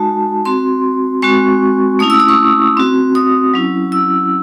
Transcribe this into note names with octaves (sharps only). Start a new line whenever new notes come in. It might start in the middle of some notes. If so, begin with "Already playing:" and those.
Already playing: G#3 D#4 F#4 A5
C4 F#4 C6
G#3 C4 F#4 C#6
A3 C#4 E4 D#6
E6
D#6
C#6
C4 F#4
D#6
F#3 C#4 E4
E6